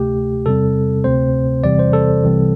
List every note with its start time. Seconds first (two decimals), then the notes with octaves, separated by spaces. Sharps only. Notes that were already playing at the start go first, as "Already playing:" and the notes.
Already playing: D2 C3 A3 G4
0.46 E2 C3 G3 C4 A4
1.04 D2 C3 A3 C4 C5
1.64 E2 C3 E3 G3 C4 D5
1.79 C5
1.93 A4
2.23 C2 C3 E3 G3 C4